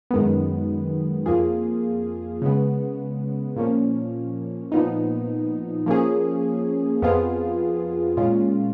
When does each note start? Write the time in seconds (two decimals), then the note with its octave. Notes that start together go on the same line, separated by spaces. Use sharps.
0.11 F#2 D#3 G#3 B3
1.26 F2 F3 A#3 F4 G#4
2.42 C#3 G#3 B3
3.56 A#2 F3 A#3 C#4
4.72 A#2 F3 B3 D#4
5.86 F3 A#3 C#4 G#4
7.02 F2 F3 B3 F4 G#4
8.17 A#2 G#3 C#4 F4